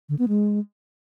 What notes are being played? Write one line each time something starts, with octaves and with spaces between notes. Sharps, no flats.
D3
B3
G#3